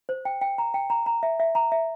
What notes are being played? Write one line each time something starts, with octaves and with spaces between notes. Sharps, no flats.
C5
G5
G5
A#5
G5
A#5
A#5
E5
E5
A#5
E5